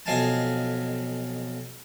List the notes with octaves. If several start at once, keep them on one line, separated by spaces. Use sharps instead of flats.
B1 F2 D#5 F5 G#5 A5